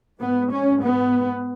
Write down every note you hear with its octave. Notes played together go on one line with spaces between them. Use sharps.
G#2 B3
C#4
B3